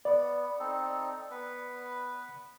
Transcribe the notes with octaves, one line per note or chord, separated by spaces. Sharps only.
B3 D5
C4 D#4 A4
B3 B4